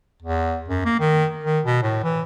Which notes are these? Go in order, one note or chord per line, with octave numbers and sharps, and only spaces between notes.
E2
F#2
A#3
D#3
D#3
B2
A2
E3